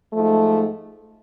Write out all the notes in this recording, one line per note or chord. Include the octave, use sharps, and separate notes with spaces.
G#2 F3 A3